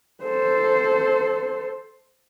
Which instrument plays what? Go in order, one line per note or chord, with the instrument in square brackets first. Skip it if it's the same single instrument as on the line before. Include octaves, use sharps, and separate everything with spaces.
[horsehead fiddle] A4 C5